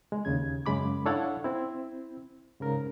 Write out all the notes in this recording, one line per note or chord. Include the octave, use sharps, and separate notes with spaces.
G#3
D#2 C#3 G#6
F#2 C#3 G#3 B5 D6
D4 E4 A4 C#5 F5 F#5
C4 E4
G#2 C#3 A#4